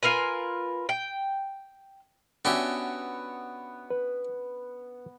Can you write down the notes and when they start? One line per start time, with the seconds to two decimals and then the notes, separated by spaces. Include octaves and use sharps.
0.03 F4 A#4 B4 G#5
0.89 G5
2.45 B3 C#4 D4 F#4 G4 E5
3.90 B4